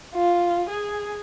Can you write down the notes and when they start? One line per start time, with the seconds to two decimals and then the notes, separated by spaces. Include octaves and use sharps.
0.15 F4
0.69 G#4